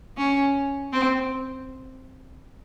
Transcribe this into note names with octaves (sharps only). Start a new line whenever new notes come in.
C#4
C4